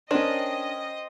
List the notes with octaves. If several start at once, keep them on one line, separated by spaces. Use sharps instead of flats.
C#4 D4 A#4 C5 D#5 G5